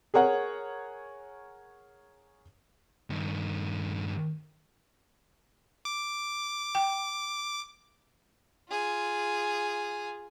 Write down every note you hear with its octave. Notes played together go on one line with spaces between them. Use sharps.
G#4 A#4 C#5 F#5
G2 D#3
D6
G5
F4 G#4